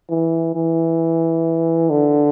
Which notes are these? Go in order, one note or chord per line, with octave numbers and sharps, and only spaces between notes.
E3
E3
D3